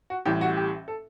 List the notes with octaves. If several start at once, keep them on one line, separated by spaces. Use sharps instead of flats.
F#4
A1 A2 G3 G4
F#4
G4
A4